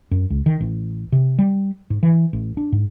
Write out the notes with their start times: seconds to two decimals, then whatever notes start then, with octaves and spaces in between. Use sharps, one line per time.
0.11 F#2
0.30 C#2
0.46 D#3
0.61 A1
1.12 C3
1.39 G3
1.90 G#2
2.03 E3
2.33 A1
2.57 D4
2.72 G#2